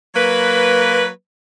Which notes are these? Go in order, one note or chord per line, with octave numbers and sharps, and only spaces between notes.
F#3 A#3 B4